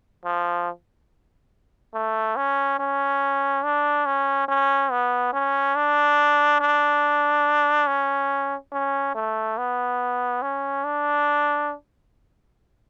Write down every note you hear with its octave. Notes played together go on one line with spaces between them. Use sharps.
F3
A3
C#4
C#4
D4
C#4
C#4
B3
C#4
D4
D4
C#4
C#4
A3
B3
C#4
D4